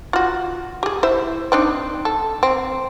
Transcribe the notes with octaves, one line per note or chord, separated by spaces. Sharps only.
F4 F#4
G4 G#4
E4 C5 E5
C4 D4 D#4
A4
C4